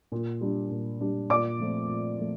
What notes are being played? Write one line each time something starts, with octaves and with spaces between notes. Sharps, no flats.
A#2
G3 D4
A#2
G3 D4
A#2 D5 D6
F3 A3 C4
A#2
F3 A3